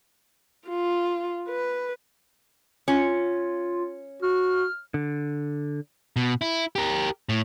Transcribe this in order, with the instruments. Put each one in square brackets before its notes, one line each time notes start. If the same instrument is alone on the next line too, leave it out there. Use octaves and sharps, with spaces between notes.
[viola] F4
B4
[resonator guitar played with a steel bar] C#4 [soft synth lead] F4
[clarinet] F#4 [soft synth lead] F6
[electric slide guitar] D3
[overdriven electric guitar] B2
E4
G4 A#4
A2